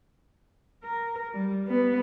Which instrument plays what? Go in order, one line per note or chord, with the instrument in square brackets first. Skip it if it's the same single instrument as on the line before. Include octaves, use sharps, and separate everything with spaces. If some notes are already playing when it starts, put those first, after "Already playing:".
[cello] A#4
G3
G3 B3